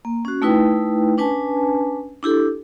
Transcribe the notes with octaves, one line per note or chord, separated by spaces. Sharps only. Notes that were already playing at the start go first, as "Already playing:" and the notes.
A#3
C#4 F#4
A3 D#4 E4 B4 G5
C#4 D4 B4 G#5 A5
D4 E4 G4 A4